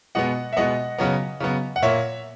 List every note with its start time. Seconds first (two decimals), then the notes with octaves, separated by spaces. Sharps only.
0.15 B2 G#3 B3 D#5 F#5
0.53 E5
0.56 B2 G#3 B3 D#5 F#5
0.98 C#3 F#3 B3
1.40 C#3 F#3 B3
1.76 F#5
1.82 A#2 A#3 C#5 E5